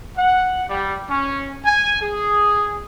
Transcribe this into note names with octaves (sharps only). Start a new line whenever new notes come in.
F#5
G3
C#4
G#5
G#4